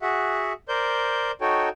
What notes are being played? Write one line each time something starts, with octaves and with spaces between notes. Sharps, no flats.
F#4 G#4 E5 F#5
A#4 C5 D5 G6
D#4 F#4 A4 C#5 G5